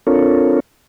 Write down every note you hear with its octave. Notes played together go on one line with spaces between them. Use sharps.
C4 D4 F4 A4 A#4 C#5